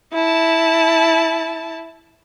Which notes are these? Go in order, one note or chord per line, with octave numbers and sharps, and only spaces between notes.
E4 A5